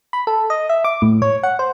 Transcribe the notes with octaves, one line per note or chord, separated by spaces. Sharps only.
B5
A4
D#5
E5
D6
A2
C#5
F#5
C5